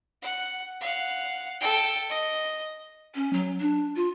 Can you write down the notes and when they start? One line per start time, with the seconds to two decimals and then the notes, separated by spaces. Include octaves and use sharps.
0.22 F#5
0.81 F5 F#5
1.61 A4 G5
2.10 D#5
3.15 C#4
3.33 F#3
3.60 D4
3.96 F4